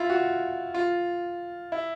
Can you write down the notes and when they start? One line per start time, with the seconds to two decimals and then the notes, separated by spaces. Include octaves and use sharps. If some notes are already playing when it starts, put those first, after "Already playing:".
Already playing: E4 F4
0.09 F#4
0.74 F4
1.72 E4